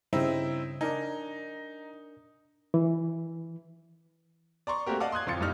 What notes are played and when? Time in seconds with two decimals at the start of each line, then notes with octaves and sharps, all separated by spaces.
0.13 G2 C#3 C4 D#4 E4
0.81 D4 D#4 A#4 G#5
2.74 E3
4.67 D5 A#5 C6 C#6
4.86 A3 A#3 C4 F#4 G4 A#4
5.00 D5 D#5 F5 F#5 A5 D6
5.12 C6 D#6 F#6 G#6
5.26 D1 F2 F4 C6 A6 C#7
5.41 G2 A#2 G3 D#4 F6